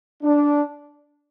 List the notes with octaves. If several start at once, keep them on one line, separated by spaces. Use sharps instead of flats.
D4